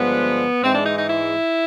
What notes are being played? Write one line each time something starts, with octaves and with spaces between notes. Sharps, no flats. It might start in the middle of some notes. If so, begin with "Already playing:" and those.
Already playing: G2 D3 F3 G#3 B3
G#2 E3 G#3 C4
D4
D#4
D#4
E4